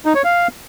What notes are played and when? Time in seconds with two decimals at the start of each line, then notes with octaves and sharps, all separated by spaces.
0.06 D#4
0.15 C#5
0.24 F5